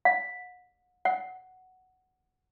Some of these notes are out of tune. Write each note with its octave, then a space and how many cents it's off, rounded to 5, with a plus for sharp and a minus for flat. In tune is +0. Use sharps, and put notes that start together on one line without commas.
F#5 -40
F#5 +5